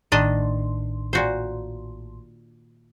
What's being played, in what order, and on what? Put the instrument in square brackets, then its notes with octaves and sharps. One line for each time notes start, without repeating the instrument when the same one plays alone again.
[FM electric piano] A1 A2 C6 [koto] D#3 D4 D#5
[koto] A#2 F#4 C5